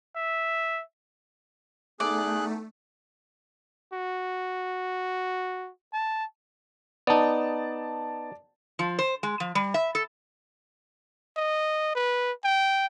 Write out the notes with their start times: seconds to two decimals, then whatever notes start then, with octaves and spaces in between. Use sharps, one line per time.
0.17 E5
2.00 E3 A3 B3 D#4 G#4 D5 F#6
3.93 F#4
5.93 A5
7.07 B3 D#4 D5 A5
8.79 F3
8.99 C5
9.23 G#3
9.40 F3
9.55 G3
9.74 E5
9.95 A4
11.37 D#5
11.95 B4
12.44 G5